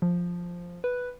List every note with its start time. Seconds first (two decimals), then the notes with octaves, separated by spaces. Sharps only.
0.02 F3
0.84 B4